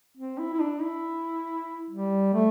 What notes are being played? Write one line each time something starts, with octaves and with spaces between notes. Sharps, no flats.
C4
E4
E4
D4
E4
G3
A3